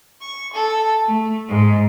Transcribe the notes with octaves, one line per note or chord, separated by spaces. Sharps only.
C#6
A4
A3
G#2